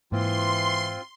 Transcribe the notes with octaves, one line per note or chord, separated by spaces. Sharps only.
G#2 E3 A#3 C4 F4 C6